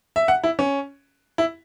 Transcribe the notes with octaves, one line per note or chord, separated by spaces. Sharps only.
E5
F#5
E4
C#4
E4